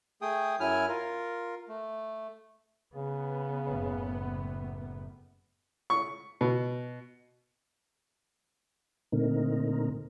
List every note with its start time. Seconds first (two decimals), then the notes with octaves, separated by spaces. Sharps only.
0.22 A3 G#4 G5 D#6
0.60 F#2 F#3 E4 G#5 F6
0.88 F4 A#4
1.68 A3
2.95 C#3 B3
3.64 F#1 A2
5.90 C#6
6.41 B2
9.12 A#2 D3 A3 C4 D#4 A#4